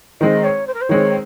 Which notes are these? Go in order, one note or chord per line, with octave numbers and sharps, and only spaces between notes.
D#3 G#3 C4 D#5
C#5
C5
A#4
C5
D#3 G#3 C4 C#5